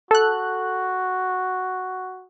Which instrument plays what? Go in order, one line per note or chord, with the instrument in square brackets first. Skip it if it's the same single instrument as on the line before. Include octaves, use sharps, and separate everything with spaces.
[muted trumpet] F#4 [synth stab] A4 F#6